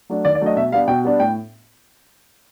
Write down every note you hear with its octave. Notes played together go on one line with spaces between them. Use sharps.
F#3 A3 D4
D#3 D5
D5
F#3 A3 D4 D#5
B2 E5
G3 B3 D4 F5
B2 G5
G3 B3 D4
A2 G5